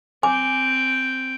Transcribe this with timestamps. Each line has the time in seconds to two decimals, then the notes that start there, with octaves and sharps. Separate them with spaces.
0.23 C4 G5 G#5 D6